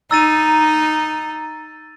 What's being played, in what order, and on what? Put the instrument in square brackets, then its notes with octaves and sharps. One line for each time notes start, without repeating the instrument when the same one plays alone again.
[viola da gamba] D#4 [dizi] A#5 [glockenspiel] E6 A6 D#7